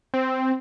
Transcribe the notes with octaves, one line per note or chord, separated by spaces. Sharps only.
C4